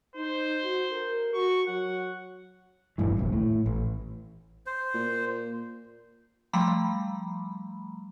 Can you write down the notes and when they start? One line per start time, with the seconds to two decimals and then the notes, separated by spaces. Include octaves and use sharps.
0.16 D#4 C5
0.63 F#4
0.92 A#4
1.34 F#4 C#6
1.68 F#3 F#5
2.98 D#1 A1 G2 E3
3.17 F1 A#1 D#2
3.33 A2
3.66 A1
4.66 C5
4.94 A#2
6.53 F3 G3 A3 A#5 B5